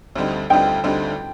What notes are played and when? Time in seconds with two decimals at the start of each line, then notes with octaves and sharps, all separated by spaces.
0.16 D2 D3 G3 C4 D#4
0.50 D2 D3 G3 C4 D#4 G5
0.84 D2 D3 G3 C4 D#4